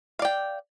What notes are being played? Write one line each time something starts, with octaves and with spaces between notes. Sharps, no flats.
D5 F5 G5